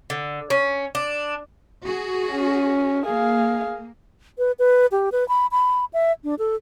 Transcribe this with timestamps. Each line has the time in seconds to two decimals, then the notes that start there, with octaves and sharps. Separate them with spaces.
0.10 D3
0.50 C#4
0.95 D4
1.85 F#4 G#4
2.32 C#4
3.06 A#3 G#4 F5
4.38 B4
4.59 B4
4.92 G4
5.12 B4
5.29 B5
5.52 B5
5.93 E5
6.24 D4
6.39 A4